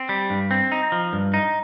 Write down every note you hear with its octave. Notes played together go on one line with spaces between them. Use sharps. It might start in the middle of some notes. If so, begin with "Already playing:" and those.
Already playing: C4
G3
G2
C4
D#4
F3
G2
D#4